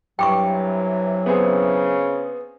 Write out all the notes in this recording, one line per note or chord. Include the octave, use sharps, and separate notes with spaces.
G2 C3 E3 F#3 G5 C#6 D6
C#3 B3 C4 G#4